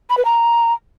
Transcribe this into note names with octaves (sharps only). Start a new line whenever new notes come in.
B5
B4
A#5